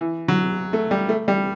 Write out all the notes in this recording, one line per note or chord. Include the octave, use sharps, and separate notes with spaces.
E3
F#3
A3
G3
A3
G3